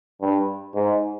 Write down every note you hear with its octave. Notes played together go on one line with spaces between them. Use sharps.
G2
G#2